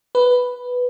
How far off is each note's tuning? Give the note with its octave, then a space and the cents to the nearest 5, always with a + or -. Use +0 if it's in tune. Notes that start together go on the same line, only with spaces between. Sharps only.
B4 +0